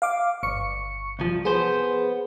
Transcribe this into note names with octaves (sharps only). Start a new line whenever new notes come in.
F5 D6
G1 C#6 C#7
C2 F3
B3 G#4 C5